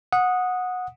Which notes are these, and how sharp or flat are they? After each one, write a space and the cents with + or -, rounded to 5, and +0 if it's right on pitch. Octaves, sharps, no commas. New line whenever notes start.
F#5 -15 D#6 +0